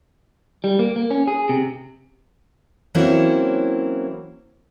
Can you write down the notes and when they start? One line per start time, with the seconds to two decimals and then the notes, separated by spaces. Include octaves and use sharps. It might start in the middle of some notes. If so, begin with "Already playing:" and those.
0.64 G3
0.79 A#3
0.96 A#3
1.11 C#4
1.28 G#4
1.49 C3
2.95 E3 F#3 A#3 C4 C#4 E4